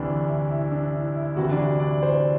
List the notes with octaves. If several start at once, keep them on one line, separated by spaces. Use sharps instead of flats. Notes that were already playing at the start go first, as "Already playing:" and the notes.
Already playing: D2 C3 E3 D4
E4
E4
D4
E4
E4
D2 C3 E3 F#4
D4
E4
D5
C5